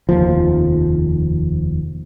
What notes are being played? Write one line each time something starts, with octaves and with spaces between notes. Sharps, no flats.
F1 D#2 F3